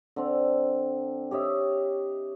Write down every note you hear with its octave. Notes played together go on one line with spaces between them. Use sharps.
D3 C4
G4 C#5 D#5 E5